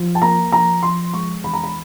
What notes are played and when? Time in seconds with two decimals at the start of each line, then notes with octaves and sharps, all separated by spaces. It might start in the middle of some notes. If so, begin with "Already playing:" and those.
Already playing: F3
0.15 A5
0.22 A#3 A#5
0.52 F3 A#5
0.83 F3 C6
1.13 G#3 C#6
1.44 E2 B5
1.53 A#5
1.64 B5